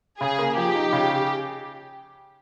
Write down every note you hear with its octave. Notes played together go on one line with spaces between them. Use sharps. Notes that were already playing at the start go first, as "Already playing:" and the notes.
C#3 G#4
A#3
F3 G4
D#4
C#3